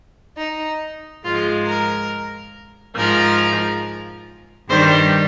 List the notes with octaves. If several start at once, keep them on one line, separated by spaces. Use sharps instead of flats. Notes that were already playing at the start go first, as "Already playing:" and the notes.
D#4
G#2 F3 G#3 F4
A#4
G#2 F3 G#3 A#4
G2 D#3 G3 C5